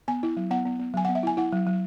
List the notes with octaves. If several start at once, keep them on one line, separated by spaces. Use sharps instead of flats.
B3 G#5
E4
F#3
B3 F#5
B3
B3
F#3 G#5
B3 F#5
E5
E4 G#5
E4 F#5
F#3
F#3